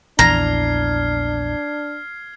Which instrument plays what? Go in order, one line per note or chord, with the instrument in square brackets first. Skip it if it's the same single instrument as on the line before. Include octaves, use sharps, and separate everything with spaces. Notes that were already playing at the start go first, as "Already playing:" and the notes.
[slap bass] A#1 E2 E3 [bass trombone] D4 [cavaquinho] A#5 [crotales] F6 G#6 C7